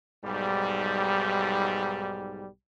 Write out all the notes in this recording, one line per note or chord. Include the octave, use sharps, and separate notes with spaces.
B1 G#2 G3